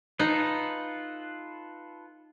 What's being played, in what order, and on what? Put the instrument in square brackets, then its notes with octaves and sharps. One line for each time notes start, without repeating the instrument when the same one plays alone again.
[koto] D#4 [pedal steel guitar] F4 A4 B4